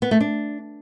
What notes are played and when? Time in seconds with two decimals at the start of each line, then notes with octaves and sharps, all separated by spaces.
0.02 B3
0.11 A3
0.21 D4